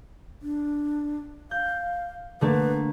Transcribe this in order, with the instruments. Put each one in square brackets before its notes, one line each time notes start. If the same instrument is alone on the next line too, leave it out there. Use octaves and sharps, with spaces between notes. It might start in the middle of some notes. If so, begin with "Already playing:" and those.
[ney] D4
[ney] F5 [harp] G6
[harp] D3 A3 A#3 [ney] B4